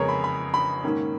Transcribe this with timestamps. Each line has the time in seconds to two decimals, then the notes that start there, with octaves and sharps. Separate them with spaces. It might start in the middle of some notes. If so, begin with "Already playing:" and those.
Already playing: F2 C#3 G#3 B3 G#4 A#4 C#5
0.09 B5
0.24 B5
0.54 B5
0.83 G#2 D#3 A#3 C#4